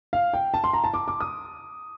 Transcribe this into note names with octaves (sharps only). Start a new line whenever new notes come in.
F5
G5
A5
C6
A#5
A5
D6
D6
D#6